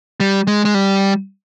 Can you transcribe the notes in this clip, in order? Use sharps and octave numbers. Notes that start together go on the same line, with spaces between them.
G3
G#3
G#3
G3